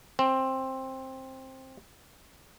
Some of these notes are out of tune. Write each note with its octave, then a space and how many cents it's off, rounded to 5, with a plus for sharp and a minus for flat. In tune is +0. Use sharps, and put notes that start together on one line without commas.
C4 +10